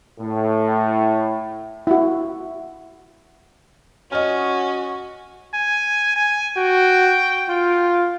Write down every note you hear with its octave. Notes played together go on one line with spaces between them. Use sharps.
A2
E4 F#4
C#4 F#4 D#5 F6
G#5
G#5
F#4 G5
F4